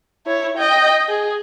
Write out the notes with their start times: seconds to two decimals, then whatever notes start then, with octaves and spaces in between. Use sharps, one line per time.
0.26 E4 C#5
0.57 D#5 G5
1.09 G#4